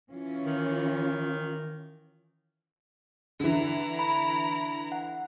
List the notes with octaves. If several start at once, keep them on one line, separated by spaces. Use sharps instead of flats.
E3 C#4 F4
D#3
D3 E3 E4 A#5
B5
F#5